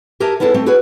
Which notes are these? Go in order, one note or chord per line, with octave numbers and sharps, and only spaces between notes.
G4 A#4 E5 G#5 A5
B3 C#4 E4 G#4 A4
A3 C4 A4
E4 F#4 G#4 B4 C#5